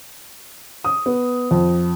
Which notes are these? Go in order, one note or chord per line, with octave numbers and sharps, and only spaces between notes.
D#6
B3
F2